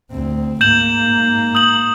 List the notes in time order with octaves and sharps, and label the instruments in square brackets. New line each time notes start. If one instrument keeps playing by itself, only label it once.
[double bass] D2 C4
[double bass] G#2 A#3 [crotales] G6 E7 F#7
[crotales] D#6 G6 F#7